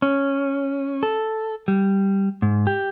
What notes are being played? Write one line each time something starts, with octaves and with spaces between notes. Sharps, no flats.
C#4
A4
G3
G#2
G4